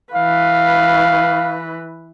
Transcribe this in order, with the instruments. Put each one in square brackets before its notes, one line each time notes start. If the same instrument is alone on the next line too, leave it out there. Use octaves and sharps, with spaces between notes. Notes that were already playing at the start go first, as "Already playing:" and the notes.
[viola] E3 B4 [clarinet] F5